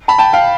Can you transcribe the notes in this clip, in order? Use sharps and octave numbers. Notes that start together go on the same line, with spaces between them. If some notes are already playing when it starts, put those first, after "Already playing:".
A5 B5
G5 A5
F5 G5